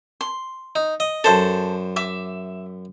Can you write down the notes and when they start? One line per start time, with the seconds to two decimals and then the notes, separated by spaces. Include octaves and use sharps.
0.21 C6
0.76 D#4
1.00 D#5
1.24 F#2 A4 C5 A5
1.96 E5 D6